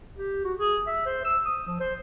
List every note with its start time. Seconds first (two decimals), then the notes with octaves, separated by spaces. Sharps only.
0.18 G4
0.45 F#4
0.59 G#4
0.87 E5
1.06 C5
1.25 E6
1.45 D#6
1.67 F3
1.81 C5